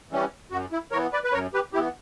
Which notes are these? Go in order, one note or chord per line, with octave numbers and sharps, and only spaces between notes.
E3 G3 C#4
F#2 F#4
E4
E3 B3 A#4 C#5
B4 D5
B4
F#2 A#4 C#5
G4 B4
E3 B3 E4 G4